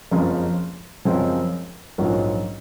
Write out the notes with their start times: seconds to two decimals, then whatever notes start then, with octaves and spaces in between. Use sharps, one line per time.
0.11 F#1 F2 C#3 F3 G#3
1.05 F#2 C#3 F3 G#3 C4
1.98 A#1 G#2 F#3 C#4 F4